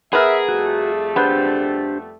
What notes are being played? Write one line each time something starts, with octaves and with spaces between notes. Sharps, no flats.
B3 G#4 A#4 E5
F2 G3 A3 F#4
B3 D4 G4 C5